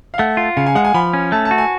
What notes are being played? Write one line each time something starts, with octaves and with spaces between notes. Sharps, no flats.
F5
A3 F#5
F4
C#3 F5
G#5
G#3 F#5
G#5
F3 B5
C#4
A3 A5
A5
F#4
G#5